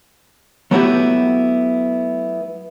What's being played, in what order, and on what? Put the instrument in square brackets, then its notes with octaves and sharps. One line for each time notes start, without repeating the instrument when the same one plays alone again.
[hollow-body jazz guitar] F#3 A3 B3 E4 F#4 G4